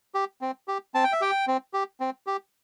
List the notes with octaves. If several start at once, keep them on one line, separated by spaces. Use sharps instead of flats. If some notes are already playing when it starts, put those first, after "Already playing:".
G4
C4
G4
C4 A5
G5
E5
G4 G5
C4
G4
C4
G4